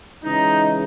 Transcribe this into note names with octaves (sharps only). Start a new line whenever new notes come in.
C#3 E3 G#3 D#4